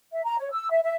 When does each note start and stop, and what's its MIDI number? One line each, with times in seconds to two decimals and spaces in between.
0.12 0.22 76
0.25 0.36 82
0.39 0.50 73
0.53 0.70 88
0.71 0.80 76
0.83 0.95 76